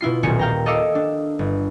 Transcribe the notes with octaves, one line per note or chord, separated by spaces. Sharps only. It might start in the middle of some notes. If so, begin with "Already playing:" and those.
B2 E4 F4 C7
D#1 B1 A#2 G#5 C#7
F5 G5 A#5
A4 D#5 F5 D6 E6 C#7
D4
G1